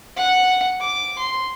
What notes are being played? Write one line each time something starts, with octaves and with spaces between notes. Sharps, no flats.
F#5
D6
C6